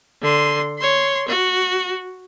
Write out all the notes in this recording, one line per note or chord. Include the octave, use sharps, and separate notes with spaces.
D3 C6
C#5 C6
F#4